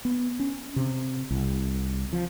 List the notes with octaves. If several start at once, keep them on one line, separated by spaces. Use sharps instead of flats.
B3
C#4
C3
C2
F3